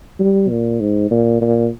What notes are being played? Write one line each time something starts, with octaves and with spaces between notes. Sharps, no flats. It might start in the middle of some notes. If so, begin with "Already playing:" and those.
G3
A#2
G#2
A#2
A#2